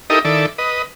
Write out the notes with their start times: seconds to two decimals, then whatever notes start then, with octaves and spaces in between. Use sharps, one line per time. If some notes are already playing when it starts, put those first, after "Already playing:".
0.10 D#4 E4 G4 A4 A#4 D#5
0.25 D#3 E4 A4 D5
0.58 B4 D#5